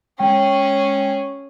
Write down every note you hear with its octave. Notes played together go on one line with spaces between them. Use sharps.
G#3 C#4 G#4 G5